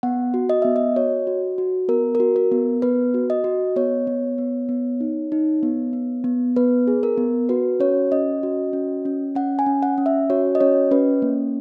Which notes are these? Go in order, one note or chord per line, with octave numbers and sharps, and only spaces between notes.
B3 F#5
F#4
D#5
B3 E5
D#5
F#4 C#5
F#4
F#4
B3 A#4
A#4
F#4
A#4
B3
B3 B4
F#4
D#5
F#4
B3 C#5
B3
B3
B3
D#4
D#4
B3
B3
B3
B3 B4
G#4
A#4
B3
F#4 B4
C#4 C#5
C#4 D#5
F#4
C#4
C#4
C#4 F#5
G#5
C#4
F#5
C#4
E5
F#4 C#5
D#5
C#4 C#5
C#4 B4
A#3